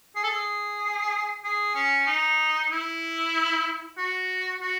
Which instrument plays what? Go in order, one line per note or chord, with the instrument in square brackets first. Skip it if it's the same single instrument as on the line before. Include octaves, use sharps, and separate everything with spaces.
[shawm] G#4
A4
G#4
G#4
C#4
D#4
E4
F#4
F#4